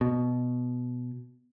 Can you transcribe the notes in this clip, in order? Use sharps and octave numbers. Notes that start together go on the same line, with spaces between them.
B2